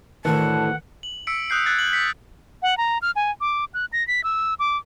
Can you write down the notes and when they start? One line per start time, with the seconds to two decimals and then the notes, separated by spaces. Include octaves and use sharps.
0.25 D2 A2 D#3 E3 A#4 F#5 A5
1.03 F#7
1.27 E6 B6 C#7 D7
1.50 D#6 F#6 G6 C7
1.66 F#6 G#6 A6 C7
1.79 F#7
1.93 B6 C#7 F#7
2.62 F#5
2.78 A#5
3.02 F6
3.16 G#5
3.41 D6
3.74 F#6
3.93 A#6
4.08 B6
4.24 E6
4.59 D6